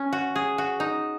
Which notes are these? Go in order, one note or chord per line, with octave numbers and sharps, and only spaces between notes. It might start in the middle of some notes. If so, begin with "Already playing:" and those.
Already playing: C#4
F#4
G#4
F#4
D#4